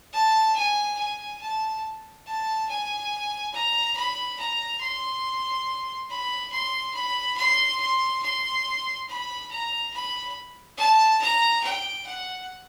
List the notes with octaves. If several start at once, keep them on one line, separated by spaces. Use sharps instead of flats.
A5
G#5
G#5
A5
A5
G#5
A#5
B5
A#5
C6
B5
C6
B5
C6
C6
C6
B5
A#5
B5
A5
A#5
G5
F#5